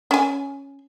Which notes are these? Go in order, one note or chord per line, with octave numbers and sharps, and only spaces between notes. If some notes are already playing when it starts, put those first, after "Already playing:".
C#4 G#5